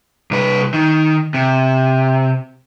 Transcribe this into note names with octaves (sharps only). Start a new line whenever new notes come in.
C2 B4
D#3
C3